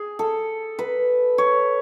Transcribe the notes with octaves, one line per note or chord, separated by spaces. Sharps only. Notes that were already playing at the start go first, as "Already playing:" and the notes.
Already playing: G#4
A4
B4
C#5